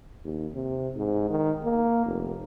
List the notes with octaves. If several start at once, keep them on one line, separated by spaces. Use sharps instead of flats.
D#2
C3
G#2
D#3
A#3
F1